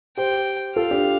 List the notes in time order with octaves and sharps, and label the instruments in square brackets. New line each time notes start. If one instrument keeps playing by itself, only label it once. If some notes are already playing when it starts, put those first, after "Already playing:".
[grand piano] G4 C5 [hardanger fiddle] G5
[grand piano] F4 A4 [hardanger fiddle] F5
[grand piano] D4 G4